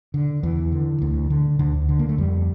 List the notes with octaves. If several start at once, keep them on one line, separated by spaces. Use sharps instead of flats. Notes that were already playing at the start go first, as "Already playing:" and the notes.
D3
E2 E3
D3
D2
D3
D2 D3
D3
A#3
A3
F2 G3